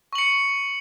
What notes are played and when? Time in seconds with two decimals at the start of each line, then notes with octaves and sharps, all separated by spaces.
0.13 C#6
0.15 F#7
0.18 C#7